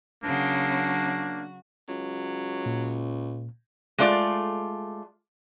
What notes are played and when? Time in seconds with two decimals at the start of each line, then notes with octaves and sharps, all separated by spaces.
0.24 C#3 F#3 A#3 D4 F#4
1.88 C#2 F#3
2.66 A#2
3.98 G#3 A3 F4 D5